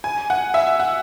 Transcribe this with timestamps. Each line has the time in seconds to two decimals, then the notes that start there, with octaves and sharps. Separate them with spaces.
0.04 G#5
0.30 F#5
0.54 E5
0.80 F#5